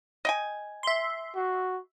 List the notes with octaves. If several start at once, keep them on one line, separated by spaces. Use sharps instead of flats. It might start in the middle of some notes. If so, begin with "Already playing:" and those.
D#5 G5 G#5
E5 C6
F#4